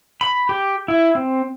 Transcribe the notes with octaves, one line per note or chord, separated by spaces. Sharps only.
B5
G4
E4
C4